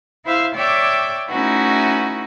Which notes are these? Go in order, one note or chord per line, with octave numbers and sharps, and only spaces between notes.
E4 C5 E5 F5
C#5 D5 E5 G5 D6
A3 C#4 D#4 E4 F#4 B4